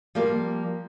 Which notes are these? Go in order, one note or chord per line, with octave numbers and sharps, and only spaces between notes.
F3 G3 A#3